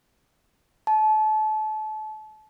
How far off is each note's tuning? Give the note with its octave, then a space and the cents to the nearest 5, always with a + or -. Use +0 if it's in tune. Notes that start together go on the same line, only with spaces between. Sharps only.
A5 -30